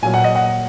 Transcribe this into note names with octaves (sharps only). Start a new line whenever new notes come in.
A#2 F#3 G#5
F#5
D#5
F#5